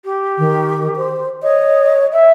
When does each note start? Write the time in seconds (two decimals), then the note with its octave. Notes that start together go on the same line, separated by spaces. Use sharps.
0.05 G4
0.38 D#3
0.96 C5
1.43 C#5 D#5
2.12 E5